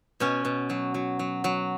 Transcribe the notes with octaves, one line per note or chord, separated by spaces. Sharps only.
B2 C#4
B2
F#3
F#3
F#3
F#3